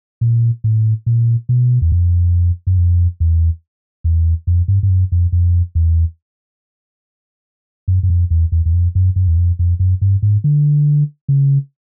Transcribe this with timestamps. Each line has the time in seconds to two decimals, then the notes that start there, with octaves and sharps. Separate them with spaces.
0.21 A#2
0.64 A2
1.06 A#2
1.49 B2
1.82 E2
1.92 F2
2.67 F#2
2.78 F2
3.20 E2
4.04 E2
4.47 F2
4.68 G2
4.83 G2
4.89 F#2
5.12 F2
5.32 F2
5.75 E2
7.88 F#2
8.03 F#2
8.10 F2
8.30 E2
8.52 E2
8.65 E2
8.73 F2
8.95 F#2
9.16 F#2
9.28 E2
9.37 F2
9.59 F2
9.79 F#2
10.01 G2
10.22 G#2
10.44 D3
11.28 C#3